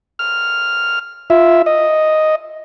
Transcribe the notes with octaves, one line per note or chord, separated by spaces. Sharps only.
F6
F4 E5
D#5